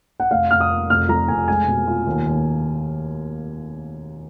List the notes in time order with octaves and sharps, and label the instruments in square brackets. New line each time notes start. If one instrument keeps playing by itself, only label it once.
[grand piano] F#5
[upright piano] F1 [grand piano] F5
[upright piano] F1 [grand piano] F6
[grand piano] D#6
[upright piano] A#3
[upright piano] F1 [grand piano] F6
[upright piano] F2 [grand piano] A#5
[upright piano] F1 [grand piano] G#5
[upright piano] G#3 [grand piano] G#5
[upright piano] B2
F4
D#2
D#2